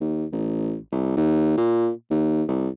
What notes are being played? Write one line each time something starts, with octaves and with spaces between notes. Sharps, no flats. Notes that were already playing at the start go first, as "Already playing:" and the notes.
D#2
A1
C2
D#2
A#2
D#2
C2